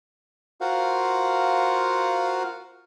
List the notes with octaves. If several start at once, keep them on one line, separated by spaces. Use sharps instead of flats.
F4 F#4 A#4 C5 F5 F#5